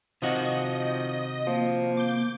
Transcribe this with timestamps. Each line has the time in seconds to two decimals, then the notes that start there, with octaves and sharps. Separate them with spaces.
0.22 C3 D#3 F3 F#4 D#5
1.47 F3 A#3
1.97 D6 G6